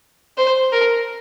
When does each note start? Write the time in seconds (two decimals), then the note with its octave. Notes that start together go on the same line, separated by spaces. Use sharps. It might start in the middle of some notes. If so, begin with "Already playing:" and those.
0.38 C5
0.72 A#4